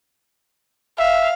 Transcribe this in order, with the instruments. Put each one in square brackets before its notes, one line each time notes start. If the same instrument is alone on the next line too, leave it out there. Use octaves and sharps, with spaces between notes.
[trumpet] E5 [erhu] F5